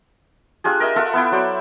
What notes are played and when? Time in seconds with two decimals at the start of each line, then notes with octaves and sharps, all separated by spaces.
0.64 D4 F4 G4 G#4
0.80 A#4 D#5 E5 G#5
0.96 F4 A4 E5 F#5
1.13 B3 E4 G5
1.31 F#3 C5 D5 E5